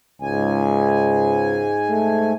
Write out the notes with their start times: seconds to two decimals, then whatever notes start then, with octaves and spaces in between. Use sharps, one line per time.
0.22 C#2 G#2 G#5
1.89 A3